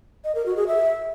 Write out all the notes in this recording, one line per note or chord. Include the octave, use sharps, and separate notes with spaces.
D#5
A#4
F#4
G#4
E5